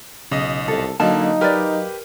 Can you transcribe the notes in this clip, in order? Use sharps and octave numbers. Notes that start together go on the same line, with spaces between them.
B1 C#3 D#5
C2 A4
D3 F#3 A#3 D#4 D#5 F5 A5
G4 A#4 B4 D5